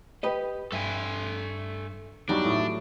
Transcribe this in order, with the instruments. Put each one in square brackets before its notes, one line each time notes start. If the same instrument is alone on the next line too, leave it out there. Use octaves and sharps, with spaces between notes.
[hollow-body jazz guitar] G4 B4 D#5
[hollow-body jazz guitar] G2 [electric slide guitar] A4 E5 G#5
[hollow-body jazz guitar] E2 D#4 [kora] G2 F#3 G3 [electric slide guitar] D4
[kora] A2